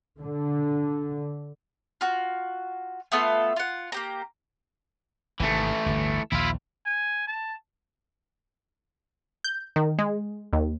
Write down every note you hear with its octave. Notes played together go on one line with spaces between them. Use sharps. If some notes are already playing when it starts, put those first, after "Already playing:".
D3
F4 F#4
A3 B3 F4 A4
F4 F#5
A#3 G4 A#5
G#1 G#2 C3 E3 A3
G1 D2
A#1 D#2 E4 F4
G#5
A5
G6
D#3
G#3
D#2